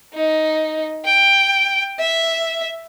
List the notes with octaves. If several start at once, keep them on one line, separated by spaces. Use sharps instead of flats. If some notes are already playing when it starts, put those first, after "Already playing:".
D#4
G5
E5